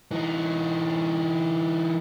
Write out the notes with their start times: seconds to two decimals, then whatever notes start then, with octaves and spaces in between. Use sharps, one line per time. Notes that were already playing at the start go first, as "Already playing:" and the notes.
0.11 E3 D#4